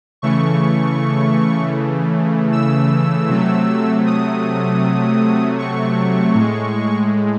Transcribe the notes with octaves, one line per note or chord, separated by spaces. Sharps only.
C#3 E3 A3 C#6
E6
C3 F#3 A3
D#6
C#6
A2
G#3